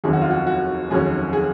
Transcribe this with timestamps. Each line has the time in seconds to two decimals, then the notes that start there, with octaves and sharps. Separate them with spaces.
0.04 F1 D#2 D#3 F#3 C#4 G#4
0.13 F#4
0.22 F4
0.31 F#4
0.47 F#4
0.90 F1 D#2 D#3 F#3 C#4 G#4
1.33 G#4